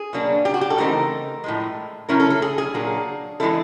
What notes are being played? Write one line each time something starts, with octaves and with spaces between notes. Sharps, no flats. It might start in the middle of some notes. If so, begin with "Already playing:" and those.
Already playing: G#4
B2 F#3 A#3 D4
G4
F#4
G4
A4
C#3 E3 A3 C4 D#4 A#4
A2 F3 G#3
C#3 F#3 A3 C#4 E4 A#4
A4
A4
G#4
G#4
A#2 F#3 A#3 D4
E3 G#3 C4 E4 A4